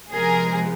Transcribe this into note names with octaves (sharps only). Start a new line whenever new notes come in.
C3 F3 G#3 B3 G#4 A#4